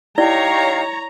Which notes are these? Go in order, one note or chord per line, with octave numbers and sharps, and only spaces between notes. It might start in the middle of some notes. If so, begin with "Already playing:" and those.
D#4 E4 G4 C#5 D5 F5 A#5